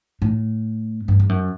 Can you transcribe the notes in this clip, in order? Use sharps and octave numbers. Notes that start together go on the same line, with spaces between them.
A2
G2
G2
F#2